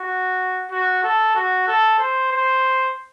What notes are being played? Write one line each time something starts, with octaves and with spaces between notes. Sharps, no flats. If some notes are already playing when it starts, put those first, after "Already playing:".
Already playing: F#4
F#4
A4
F#4
A4
C5
C5